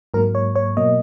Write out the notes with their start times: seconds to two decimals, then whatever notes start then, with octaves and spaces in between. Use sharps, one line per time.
0.14 G#2 F#3 A#3 A#4
0.35 C#5
0.55 C#5
0.77 B2 F#3 A#3 D#5